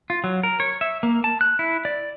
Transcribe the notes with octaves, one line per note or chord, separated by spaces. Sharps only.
F4
F#3
A#4
C#5
E5
A#3
A5
F#6
E4
D5